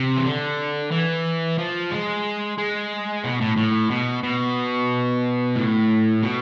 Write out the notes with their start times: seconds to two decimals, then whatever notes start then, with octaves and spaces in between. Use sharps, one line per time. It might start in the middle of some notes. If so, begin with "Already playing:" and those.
Already playing: C3
0.17 E3
0.25 D3
0.91 E3
1.58 F3
1.92 G#3
2.58 G#3
3.24 B2
3.41 A2
3.57 A2
3.91 B2
4.24 B2
5.56 A2
6.23 B2